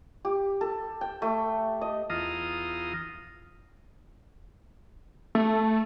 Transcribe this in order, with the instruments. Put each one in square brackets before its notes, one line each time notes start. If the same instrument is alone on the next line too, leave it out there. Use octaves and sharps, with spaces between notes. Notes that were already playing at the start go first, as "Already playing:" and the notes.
[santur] G4
A4
G5
A3
D#5
[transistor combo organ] E2 F4 A#5 D#6
[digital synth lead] A3